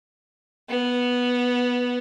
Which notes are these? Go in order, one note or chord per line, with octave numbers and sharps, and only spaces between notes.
B3